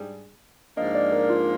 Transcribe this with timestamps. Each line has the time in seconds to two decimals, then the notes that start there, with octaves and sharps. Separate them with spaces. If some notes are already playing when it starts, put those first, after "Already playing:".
Already playing: G#2 G3 D4 G#4
0.77 G#2 F3 A#3 D4 D#5
0.95 D5
1.12 A#4
1.30 F4